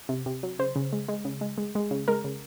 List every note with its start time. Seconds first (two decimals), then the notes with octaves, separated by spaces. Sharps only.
0.09 C3
0.26 C3
0.43 F#3
0.59 C#3 C5
0.76 C#3
0.93 G#3
1.08 G#3
1.25 C#3
1.41 G#3
1.58 G#3
1.75 G#3
1.91 C#3
2.08 G#3 A#4
2.24 C#3